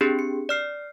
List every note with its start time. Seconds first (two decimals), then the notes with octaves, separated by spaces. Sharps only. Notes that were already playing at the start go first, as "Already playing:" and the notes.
0.01 C4 D4 G4 G#4
0.19 C#7
0.49 D5 F6 C7